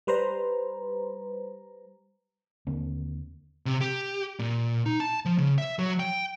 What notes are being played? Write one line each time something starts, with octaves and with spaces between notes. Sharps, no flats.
G3 B4 C5 A#5
D#2 D3 A#3 C4
C3
G4
A#2
D#4
A5
F3
C#3
E5
F#3
G5